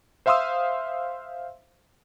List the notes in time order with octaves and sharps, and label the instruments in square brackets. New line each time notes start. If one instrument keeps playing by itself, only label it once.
[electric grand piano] C5 E5 F5 C6 D#6 E6